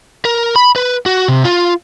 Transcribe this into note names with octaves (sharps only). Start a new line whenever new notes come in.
A#4
B5
B4
F#4
C3
F4